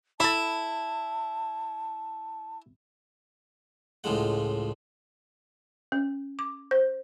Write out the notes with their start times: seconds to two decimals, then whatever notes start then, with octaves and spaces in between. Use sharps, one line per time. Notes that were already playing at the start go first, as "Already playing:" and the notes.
0.20 E4 A4 A5 B5
4.04 C#2 A2 F3 G#3 F#5
5.92 C#4
6.39 D6
6.71 C5